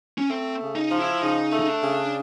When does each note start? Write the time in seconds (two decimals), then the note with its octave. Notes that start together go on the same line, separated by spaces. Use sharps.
0.18 C#4
0.29 A3 C4
0.61 C#3
0.75 D#4
0.91 F3
0.99 E4
1.22 C#3 D#4
1.52 A3
1.59 D#4
1.68 D4
1.82 C#3